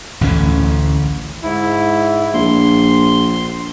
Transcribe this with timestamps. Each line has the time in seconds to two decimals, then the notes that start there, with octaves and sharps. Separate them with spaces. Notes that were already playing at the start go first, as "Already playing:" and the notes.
0.21 A1 D2 D3 C#4
1.43 G#2 E4
2.34 A#1 C6